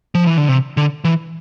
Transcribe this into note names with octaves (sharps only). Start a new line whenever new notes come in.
F3
E3
D3
C3
D3
E3